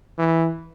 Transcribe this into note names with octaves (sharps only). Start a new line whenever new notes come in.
E3